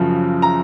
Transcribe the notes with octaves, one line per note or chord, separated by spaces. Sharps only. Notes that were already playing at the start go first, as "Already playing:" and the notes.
Already playing: F#2 C#3 F3
A#5